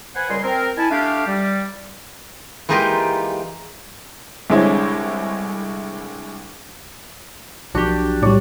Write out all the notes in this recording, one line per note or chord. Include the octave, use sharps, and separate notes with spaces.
B4 C5 F#5 G#5
C#2 A#2 G3 D#5 G#5 C6
C4 A#4
D#4 E4 G#5 A5
A3 D4 G4 F5
G3
E3 G#3 A#3 D#4 F4 G4
C2 D3 G#3 E4 C5 C#5
B1 F3 D4 F#4 G4
A2 G3 D4 C#5 D5